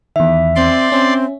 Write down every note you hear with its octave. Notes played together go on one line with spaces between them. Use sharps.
E2 D#3 E5
C4 D5 C6
C4 C#4